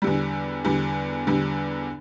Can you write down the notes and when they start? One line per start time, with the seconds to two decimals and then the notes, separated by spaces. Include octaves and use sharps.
0.02 E2 D3 G3
0.65 E2 D3 G3
1.27 E2 D3 G3